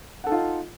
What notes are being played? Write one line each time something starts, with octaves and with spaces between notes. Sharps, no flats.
D#4 F4 A4 F#5